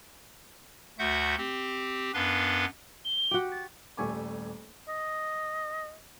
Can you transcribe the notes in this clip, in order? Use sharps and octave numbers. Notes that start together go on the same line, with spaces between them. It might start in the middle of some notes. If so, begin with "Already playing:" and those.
D2 A3 F#4 E5 F#5 G6
C4 G4
F#2 B3 D4 B4 F5 C6
G7
F#4 G4
A6
D#1 G3 A3 G#5 C#6 D6
D#5